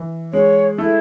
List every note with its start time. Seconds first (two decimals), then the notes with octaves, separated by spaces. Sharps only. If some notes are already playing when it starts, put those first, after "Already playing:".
Already playing: E3
0.33 G#3 C#5
0.78 A3 E4